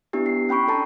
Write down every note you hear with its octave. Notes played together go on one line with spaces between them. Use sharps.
B3 D4 E4 G4
C7
C#4 G5 B5 C#6 D7
D4 A4 G5 A5 A#5